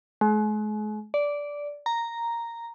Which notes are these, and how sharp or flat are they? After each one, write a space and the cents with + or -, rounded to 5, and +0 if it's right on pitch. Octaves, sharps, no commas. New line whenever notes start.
G#3 +40
D5 -10
A#5 -5